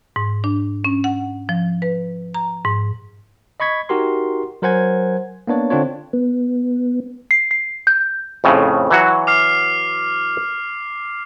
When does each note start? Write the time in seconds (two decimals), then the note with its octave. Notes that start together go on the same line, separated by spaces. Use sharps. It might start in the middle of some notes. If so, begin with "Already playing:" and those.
0.16 G#2
0.44 D4
0.84 C#4
1.04 F#5
1.49 F3
1.82 B4
2.34 A#5
2.65 G#2
3.60 D#5 B5 C#6 G#6 B6
3.89 D#4 F#4 G4 A#4 C6
4.62 F#3 A#4 C5 F#5 G#5 G#6
5.47 A#3 B3 D4 C#5
5.70 D3 C4 D4 F4 C#5
6.13 B3
7.31 C7
7.51 C7
7.87 G6
8.44 F2 A2 C#3
8.91 E3 F#3 F#4
9.27 D6 F6 C7